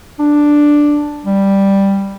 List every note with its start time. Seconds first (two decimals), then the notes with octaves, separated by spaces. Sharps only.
0.20 D4
1.25 G3